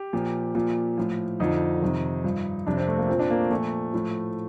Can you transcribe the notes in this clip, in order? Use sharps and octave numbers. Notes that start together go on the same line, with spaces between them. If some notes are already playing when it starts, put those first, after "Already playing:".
Already playing: G4
A#2 F3
A#2 F3
A2 F3
F2 D3 F3 D#4
F2 C3 D#3
G2 F3
F2 C3 F3 D4
C4
A3
A#3
A#2 F3 C4
D4
A#3
A3
A#2 F3 A3
A2 F3